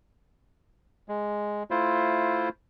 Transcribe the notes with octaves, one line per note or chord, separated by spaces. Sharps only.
G#3
A3 E4 F4 C5